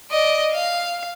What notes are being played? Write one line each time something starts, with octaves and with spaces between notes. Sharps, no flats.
D5 D#5
F5